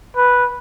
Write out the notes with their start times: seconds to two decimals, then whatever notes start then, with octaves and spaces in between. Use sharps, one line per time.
0.17 B4